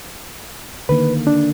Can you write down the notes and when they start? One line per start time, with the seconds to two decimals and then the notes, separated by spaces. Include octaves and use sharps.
0.89 D3 D#3 A#3 B4
1.27 D4